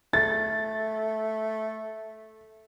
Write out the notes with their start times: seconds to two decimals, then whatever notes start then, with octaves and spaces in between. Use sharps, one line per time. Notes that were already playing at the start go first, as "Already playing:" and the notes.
0.13 A3 A6